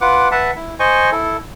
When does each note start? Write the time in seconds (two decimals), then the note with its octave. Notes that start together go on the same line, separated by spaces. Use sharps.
0.01 F4 B4 F#5 D6
0.31 B4 E5 F#5 A5
0.56 E4
0.79 C5 D#5 G#5 C#6
1.12 E4 A4